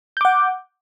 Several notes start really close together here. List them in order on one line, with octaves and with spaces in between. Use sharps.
G6 D6 F#5